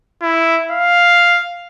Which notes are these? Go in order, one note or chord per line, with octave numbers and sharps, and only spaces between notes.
E4
F5